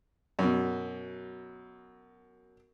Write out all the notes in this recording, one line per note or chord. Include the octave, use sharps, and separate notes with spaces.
F#2 B2